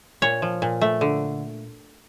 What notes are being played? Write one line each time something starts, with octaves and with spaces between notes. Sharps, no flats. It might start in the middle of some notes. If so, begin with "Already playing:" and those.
A#2 C#5
F3
A#2
A3
D3